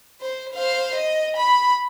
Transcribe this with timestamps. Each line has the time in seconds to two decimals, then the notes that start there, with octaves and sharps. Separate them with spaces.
0.21 C5
0.54 C5 F5
0.95 D#5
1.36 B5